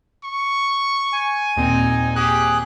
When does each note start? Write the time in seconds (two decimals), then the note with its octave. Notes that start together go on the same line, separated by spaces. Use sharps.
0.23 C#6
1.13 G#5
1.57 D#2 A#2 C4 D#4
2.16 G4 G#4 F#6